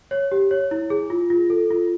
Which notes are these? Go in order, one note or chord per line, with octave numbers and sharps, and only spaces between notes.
C#5
G4
C#5
E4
G#4
F4
F4
A4
F4